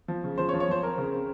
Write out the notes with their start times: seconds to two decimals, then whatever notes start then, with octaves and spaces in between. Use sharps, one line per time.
0.08 F3
0.24 C#3
0.38 F3 C5
0.49 C#5
0.54 F3
0.60 C#5
0.69 F3 C5
0.83 C4 A#4
0.98 C#3
1.12 C4